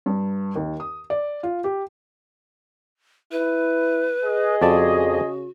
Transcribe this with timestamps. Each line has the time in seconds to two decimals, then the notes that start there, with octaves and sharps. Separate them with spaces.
0.06 G2
0.56 D#2
0.80 D#6
1.10 D5
1.43 F4
1.64 G4
3.32 E4 B4
4.24 G#4 D#5
4.62 F2 C#3 F#4 D5 A5